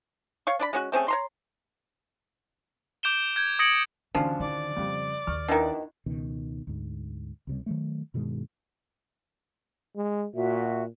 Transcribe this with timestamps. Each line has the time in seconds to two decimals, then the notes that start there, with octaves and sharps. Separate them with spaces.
0.47 C#5 F5 C#6
0.59 D4 D5 B5
0.73 G#3 C#4 F#4
0.92 A3 C4 C#4 G#4
1.08 C#5 A#5 C6
3.03 D6 G6 D7 E7 G7
3.36 G6 G#6
3.59 D#6 G#6 A#6 C#7 D7 F#7
4.15 D2 E3 F3 C#4 D4
4.40 D#3 D5
4.77 F2 C#3 G3
5.27 D#2 C#6 F6
5.48 B2 D#3 D4 E4 E5
6.06 C#2 B2 D#3
6.67 D2 G#2
7.47 C#2 C3 G3
7.66 D#3 F#3 A3
8.14 G2 B2 D#3 G#3
9.96 G#3
10.34 A#2 F#4 E5